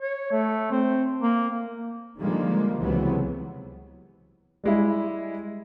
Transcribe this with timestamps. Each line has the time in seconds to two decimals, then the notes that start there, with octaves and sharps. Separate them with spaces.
0.01 C#5
0.31 A3
0.71 C4
1.22 A#3
2.19 D3 D#3 F3 G3 G#3 A#3
2.79 C#2 C3 E3 F#3 B3
4.64 G3 G#3 E4